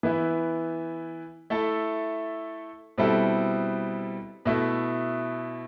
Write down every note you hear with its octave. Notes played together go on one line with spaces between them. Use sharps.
E3 B3 E4
A3 E4 A4
B2 G3 C4 E4 A4
B2 A3 E4